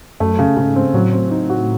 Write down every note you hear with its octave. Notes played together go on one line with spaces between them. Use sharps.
F#2 A3
C#3
G#2 C#3
C4
A2 F#3
C4
D#4
F#4